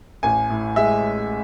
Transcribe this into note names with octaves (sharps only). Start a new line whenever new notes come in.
A1 G#5
A2
G#3 E5